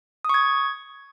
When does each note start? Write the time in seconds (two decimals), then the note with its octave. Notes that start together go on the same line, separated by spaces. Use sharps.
0.25 D#6
0.29 C#6
0.34 G#6